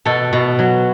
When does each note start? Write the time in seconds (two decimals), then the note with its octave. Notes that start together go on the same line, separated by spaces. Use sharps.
0.05 B2 A4
0.33 B2
0.59 F#3